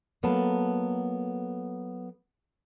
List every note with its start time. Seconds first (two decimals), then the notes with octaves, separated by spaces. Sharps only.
0.23 F#3 A#3 B3 A4 A5